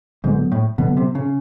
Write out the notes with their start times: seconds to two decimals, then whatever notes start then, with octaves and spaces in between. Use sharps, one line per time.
0.24 G#2 D3 F#3 B3
0.52 A2
0.78 B2 D3 F#3 B3
0.97 C3
1.15 C#3